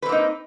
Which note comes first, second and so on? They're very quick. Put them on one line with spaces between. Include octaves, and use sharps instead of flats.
B4 C4 A#3 D#4